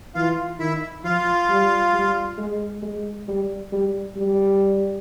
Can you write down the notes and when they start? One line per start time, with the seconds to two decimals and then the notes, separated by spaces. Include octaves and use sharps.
0.15 E3 F4 F5
0.59 D#3 E4 E5
1.04 F3 F4 F5
1.50 G3
1.93 G3
2.38 G#3
2.82 G#3
3.28 G3
3.72 G3
4.16 G3